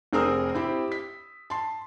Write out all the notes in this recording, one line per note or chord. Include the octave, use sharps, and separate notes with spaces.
F1 C4 G#4 A#4 D#6 E6
C4 E4 G4
B6
A5 C6